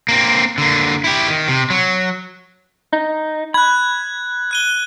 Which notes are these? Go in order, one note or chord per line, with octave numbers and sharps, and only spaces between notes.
A#3 C4
D3 A#3
E4 G4
D#3
C3
F#3
D#4
B5 F#6 G#6
F#6 D#7 G7